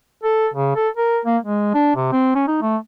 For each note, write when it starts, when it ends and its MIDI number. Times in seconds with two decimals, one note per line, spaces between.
0.24 0.48 69
0.54 0.75 49
0.76 0.89 69
0.97 1.19 70
1.25 1.38 58
1.43 1.71 56
1.74 1.95 62
1.96 2.10 48
2.13 2.35 60
2.35 2.43 61
2.47 2.59 63
2.62 2.77 57